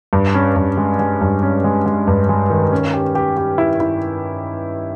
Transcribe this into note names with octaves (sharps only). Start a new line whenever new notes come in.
G2
C#4
G2
G#3
G#3
G2
C#4
G#3
G#3
G2
G#3
D#3
C#4
G4
G4
G4
E4
E4